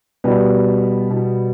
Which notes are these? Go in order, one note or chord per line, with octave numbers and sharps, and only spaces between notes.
B2 G3 B3
B2